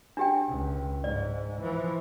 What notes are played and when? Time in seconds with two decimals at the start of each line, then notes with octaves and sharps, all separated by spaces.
0.17 D4 G4 G5
0.49 C#2
1.04 G#2 D5
1.61 E3 F3